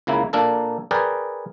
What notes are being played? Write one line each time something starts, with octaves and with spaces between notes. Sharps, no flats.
C#2 C#3 A#3 E4
A#2 A#3 D4 A4 A#4
G#4 A#4 B4 D5 G5